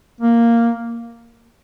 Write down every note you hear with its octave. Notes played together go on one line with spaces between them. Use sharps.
A#3